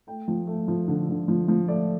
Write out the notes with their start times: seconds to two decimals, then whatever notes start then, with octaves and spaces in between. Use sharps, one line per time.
0.07 A3 G5
0.28 F3
0.47 A3
0.68 F3
0.88 D3
1.09 D3
1.28 F3
1.48 F3
1.68 A3 D5